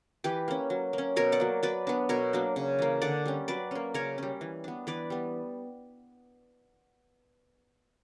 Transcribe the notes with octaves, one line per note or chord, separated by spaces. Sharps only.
E3 G4 B4
A#3 C#4
F#3
A#3 C#4
B2 A#4 C#5
D5 F#5
F#3 A#3
F#3 B4 D5
B3 D4
B2 A#4 C#5
F#3 A#3 D4
C#3
E3 A#3
D3 D5 F#5
G3 C#4
F#3 B4 D5
A#3 C#4
C#3 A#4 C#5
G3 C#4
E3
B3 D4
E3 B4 D5
G3 B3